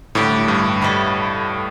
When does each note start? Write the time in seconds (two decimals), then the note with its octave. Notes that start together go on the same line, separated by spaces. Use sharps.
0.15 A2 D3 G3 D4 G4
0.48 G2
0.81 B2 G3 E4 A4